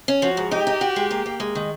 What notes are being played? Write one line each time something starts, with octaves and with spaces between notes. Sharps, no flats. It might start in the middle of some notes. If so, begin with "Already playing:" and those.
C#4
F3 F#4
G#2
D#4 G4
D#4
F#4
G#3
A#3
A#3
G#3
D#3